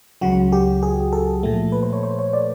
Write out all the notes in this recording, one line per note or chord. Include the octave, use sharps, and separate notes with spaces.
C#2 C#3 F#3 F#4
G4
G#4
A4
A#2 F3 A3
B4
C5
C#5
C5
C#5
D5